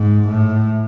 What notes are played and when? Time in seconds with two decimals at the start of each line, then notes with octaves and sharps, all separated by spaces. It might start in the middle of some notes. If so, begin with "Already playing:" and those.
Already playing: G#2
0.28 A2